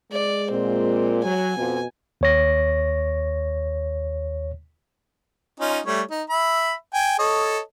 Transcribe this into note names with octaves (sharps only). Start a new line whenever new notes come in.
G#3 D5
A#2 C4
F#3 G#5
F2 B2
D#2 C#5 A#6
C#4 D#4 F4
G3 A3 C#5
D#4
E5 B5
G5 G#5
A4 C#5 D#5